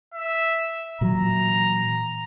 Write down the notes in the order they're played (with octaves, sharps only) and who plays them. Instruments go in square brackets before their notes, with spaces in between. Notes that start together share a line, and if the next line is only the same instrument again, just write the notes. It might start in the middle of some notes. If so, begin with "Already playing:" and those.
[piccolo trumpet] E5
[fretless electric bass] A#2 E3 F#3 [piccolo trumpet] A#5